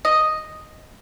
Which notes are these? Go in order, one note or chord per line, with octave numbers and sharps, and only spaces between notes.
D#5